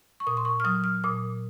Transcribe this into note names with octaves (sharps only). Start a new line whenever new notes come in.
C#6
A#2 D#6
C6
C#6
F6
F#3 D#6
F6
A#2 D#6